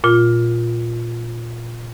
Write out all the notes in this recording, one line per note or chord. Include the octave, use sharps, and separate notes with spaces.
A#2 F4